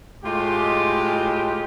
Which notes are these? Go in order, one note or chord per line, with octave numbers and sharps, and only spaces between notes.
A2 G#3 F4 G4